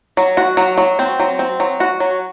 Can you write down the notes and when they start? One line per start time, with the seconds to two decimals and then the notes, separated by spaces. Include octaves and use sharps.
0.17 F#3
0.37 F#4
0.57 F#3
0.78 F#3
0.99 C4
1.20 F#3
1.39 C4
1.60 F#3
1.80 F#4
2.00 F#3